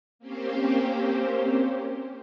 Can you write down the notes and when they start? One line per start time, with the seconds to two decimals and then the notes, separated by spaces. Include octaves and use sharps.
0.19 A#3 C4 C#4 G4 C5